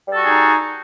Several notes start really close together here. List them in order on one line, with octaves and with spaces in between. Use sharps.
G3 A4 F#4 G#4 D#4